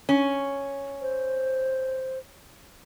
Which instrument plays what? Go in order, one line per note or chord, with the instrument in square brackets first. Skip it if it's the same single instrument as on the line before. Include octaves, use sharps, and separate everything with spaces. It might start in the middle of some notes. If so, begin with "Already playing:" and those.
[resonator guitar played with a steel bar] C#4
[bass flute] C5